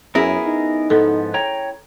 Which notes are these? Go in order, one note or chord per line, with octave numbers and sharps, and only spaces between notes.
F#2 B3 C#4 E4 G#4 A#4
D#4
G#2 F3 B3 A4
C#5 G5 A#5